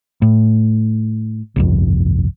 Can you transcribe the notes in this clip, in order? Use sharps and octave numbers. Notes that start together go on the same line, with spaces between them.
A2
G1 C2 F2